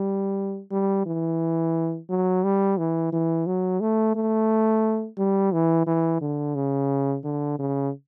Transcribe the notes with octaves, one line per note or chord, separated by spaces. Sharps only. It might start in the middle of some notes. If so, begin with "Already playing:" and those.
Already playing: G3
G3
E3
F#3
G3
E3
E3
F#3
A3
A3
G3
E3
E3
D3
C#3
D3
C#3